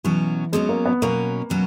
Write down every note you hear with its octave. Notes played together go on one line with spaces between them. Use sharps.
B2 E3 F#3 C#4
B2 F#3 G#3 C#4
A#3
B3
B2 F#3 A#3 C#4
B2 F#3 C#4